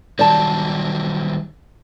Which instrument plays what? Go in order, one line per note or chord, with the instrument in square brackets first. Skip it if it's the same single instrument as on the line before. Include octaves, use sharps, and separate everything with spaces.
[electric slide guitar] D#3 F#3 G3 [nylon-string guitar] D5 A5